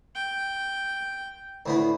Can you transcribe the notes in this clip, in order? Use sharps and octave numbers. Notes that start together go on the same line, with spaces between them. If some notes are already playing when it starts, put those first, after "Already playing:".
G5
D2 A2 B3